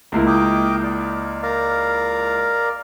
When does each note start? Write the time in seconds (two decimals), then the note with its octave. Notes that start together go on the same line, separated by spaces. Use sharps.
0.12 C#2 A#3 E4
0.27 D#5 G5 D6
0.83 D5
1.43 A#4 D5 F5